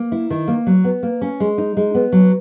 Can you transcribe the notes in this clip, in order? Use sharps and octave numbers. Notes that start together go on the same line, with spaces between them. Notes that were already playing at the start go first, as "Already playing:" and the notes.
Already playing: A#3
E4
D#3
A#3
F#3
B3
A#3
C#4
G#3
D#4
G#3
B3
F#3